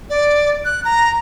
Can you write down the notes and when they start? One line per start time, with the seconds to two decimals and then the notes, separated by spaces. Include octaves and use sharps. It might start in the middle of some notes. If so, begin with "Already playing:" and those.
0.10 D5
0.65 F#6
0.85 A#5